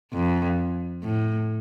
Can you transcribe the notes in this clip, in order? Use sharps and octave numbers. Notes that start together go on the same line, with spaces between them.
F2
A2